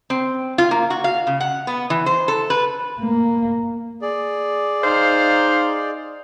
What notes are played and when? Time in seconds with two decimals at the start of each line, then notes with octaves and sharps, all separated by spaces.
0.10 C4
0.58 F4
0.71 A#3
0.90 F#4
1.04 F5
1.27 C#3
1.40 F#5
1.67 B3
1.90 E3
2.06 C5
2.28 A4
2.50 B4
3.00 A#3
4.02 G#4 D5
4.84 D#4 C5 F5